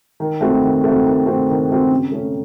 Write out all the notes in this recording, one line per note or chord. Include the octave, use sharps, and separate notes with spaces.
D#3
A3 C4 F#4
D#3
A3 C4 F#4
D#3
A3 C4 F#4
D#3
A3 C4 F#4
C#3
A3 C#4